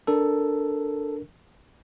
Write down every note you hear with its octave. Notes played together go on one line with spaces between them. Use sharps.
D4 A4 A#4